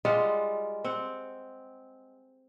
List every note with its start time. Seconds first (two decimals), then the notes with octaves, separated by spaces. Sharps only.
0.05 G3 G#3 F4 F#5
0.84 C4 F#5